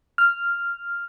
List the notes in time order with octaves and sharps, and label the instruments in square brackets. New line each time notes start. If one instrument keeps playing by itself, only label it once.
[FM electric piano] F6